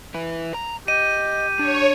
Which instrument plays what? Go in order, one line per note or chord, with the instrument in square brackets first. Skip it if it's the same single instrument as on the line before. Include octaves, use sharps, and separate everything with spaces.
[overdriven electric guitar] E4 B4
A#5
[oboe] G4 [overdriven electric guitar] D#5 [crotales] D#7
[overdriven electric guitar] D4 [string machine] C#5